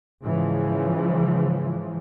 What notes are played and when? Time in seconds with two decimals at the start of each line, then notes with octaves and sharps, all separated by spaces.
0.23 G#2 C#3 E3 F3